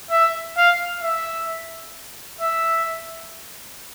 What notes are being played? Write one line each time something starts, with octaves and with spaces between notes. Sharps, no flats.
E5
F5
E5
E5